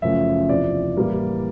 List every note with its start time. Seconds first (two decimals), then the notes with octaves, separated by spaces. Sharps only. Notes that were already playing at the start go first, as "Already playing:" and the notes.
0.02 F#2 C#3 F3 A3 E5
0.49 E2 C3 F3 D5
0.97 A2 E3 G3 A#3